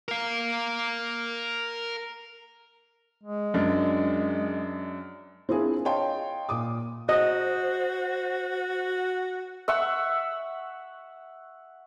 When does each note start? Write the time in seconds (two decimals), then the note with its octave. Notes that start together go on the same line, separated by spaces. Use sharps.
0.08 A#4 F5
3.23 G#3
3.54 F#2 D4
5.49 C4 D4 E4 F4 G#4 A#4
5.85 C#5 D#5 F5 G5 A5 C6
6.49 A#2 D6 D#6
7.09 F#4 C5 D#5
9.68 E5 F#5 C#6 E6